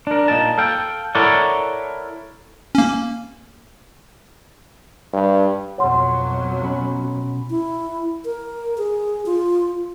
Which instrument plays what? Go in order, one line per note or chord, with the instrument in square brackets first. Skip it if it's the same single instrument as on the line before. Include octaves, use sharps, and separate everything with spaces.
[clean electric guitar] D4 A#4
A#2 D#4 A5
A4 F5 G5
E4 A4 A#4 C#5 D5 F#5
[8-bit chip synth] A#3 C#4
[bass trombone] G2
[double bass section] B1 F2 F#3 [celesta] C#5 F#5 C6
[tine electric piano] B2 C#4 B5
[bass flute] E4
A#4
G#4
F4